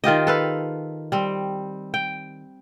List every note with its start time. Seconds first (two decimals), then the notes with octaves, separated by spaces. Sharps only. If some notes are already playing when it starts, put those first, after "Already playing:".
0.04 D#3 F4 G4 D#5
0.27 A4 B4 F5
1.12 G3 C4
1.94 G5